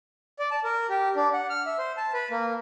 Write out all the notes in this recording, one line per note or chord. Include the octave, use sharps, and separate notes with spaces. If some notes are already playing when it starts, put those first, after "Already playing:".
D5
A5
A#4
G4
D4
F#5
F6
E5
C5
A5
B4
A#3